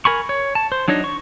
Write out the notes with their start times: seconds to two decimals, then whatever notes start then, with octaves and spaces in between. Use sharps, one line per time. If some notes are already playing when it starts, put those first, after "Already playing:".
0.05 A#4 G#5 B5 C#6
0.29 C#5
0.55 A5
0.72 C5
0.88 F#3 D4 D#4 C#5 D#5
1.04 C#6